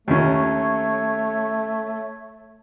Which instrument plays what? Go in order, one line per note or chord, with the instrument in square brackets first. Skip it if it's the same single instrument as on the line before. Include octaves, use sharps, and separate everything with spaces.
[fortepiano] D#2 C#4 [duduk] A3 [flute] C#5